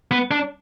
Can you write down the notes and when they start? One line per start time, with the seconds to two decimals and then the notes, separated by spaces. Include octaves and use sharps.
0.11 B3
0.31 D4